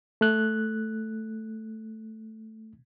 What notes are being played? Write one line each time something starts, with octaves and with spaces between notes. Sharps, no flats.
A3 F#6